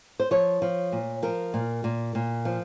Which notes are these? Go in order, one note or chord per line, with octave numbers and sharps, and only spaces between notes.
C5
F3 C#5
F3
A#2
F3 A#4
A#2
A#2
A#2
F3